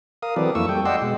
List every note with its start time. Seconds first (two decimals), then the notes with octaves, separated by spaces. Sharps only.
0.23 A#4 F5 D#6
0.36 E3 F#3 C4 A4 B4 D5
0.55 F2 A3 A#3 E4 C#6 E6
0.69 G3 A4 G5
0.85 D5 D#5 F#5 G5 C6 E6
1.02 B2 G#3